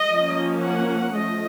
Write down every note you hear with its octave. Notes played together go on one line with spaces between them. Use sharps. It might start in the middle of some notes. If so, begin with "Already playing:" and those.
Already playing: D#5
F3 A#3 C#4
F#5
F3 A3 D#5